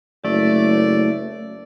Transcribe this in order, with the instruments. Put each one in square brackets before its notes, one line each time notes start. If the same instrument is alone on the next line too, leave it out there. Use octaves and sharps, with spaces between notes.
[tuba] F#1 [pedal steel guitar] A3 [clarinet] D5